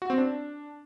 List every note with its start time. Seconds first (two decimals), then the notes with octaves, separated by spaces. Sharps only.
0.02 F#4
0.10 C4
0.18 D4